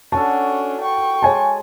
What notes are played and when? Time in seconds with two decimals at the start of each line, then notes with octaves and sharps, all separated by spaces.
0.12 C#4 D4 F#4 A4 A5
0.81 G5 C#6
1.22 G#3 C#5 G#5 A5